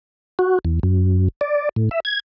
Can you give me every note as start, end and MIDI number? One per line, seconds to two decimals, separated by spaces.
0.39 0.59 66
0.65 0.79 40
0.83 1.28 42
1.41 1.69 74
1.76 1.89 45
1.91 2.00 76
2.05 2.20 92